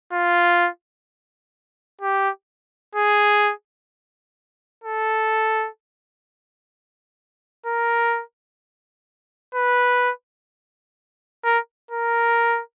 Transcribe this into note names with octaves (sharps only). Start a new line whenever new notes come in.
F4
G4
G#4
A4
A#4
B4
A#4
A#4